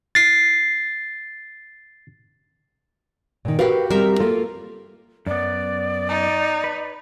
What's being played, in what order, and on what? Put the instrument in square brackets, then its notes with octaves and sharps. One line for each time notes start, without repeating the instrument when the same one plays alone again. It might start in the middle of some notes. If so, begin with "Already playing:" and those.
[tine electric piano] A6 C7
[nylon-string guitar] A#2 D#3
[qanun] F#4 G4 [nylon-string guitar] A#4 B4 F5
[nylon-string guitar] G3 C4 [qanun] A#4 E5
[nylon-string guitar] A#3 F4 A4
[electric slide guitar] F#2 B3 [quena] D5
[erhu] D#4
[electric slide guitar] B4